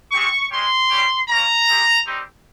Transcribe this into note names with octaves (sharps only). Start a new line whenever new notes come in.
G#3 C4 G4 C#6
G#3 C#4 G4 C6
G3 C#4 G4
A#3 C#4 F4 A#5
G#3 C4 G4
G3 C4 D#4 G4